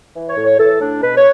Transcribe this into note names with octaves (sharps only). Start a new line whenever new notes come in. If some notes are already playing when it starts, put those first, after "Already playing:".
E3
C#5
A2
C#5
E3 A4
A2 D4
B2 B4
C#5